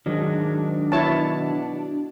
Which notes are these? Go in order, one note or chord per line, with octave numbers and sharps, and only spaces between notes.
G#2 D#3 F#3 D4
B2 E4 C#5 A5